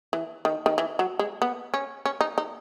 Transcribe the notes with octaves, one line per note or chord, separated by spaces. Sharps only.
E3
D#3
D#3
E3
F#3
G#3
B3
C#4
C#4
D#4
D#4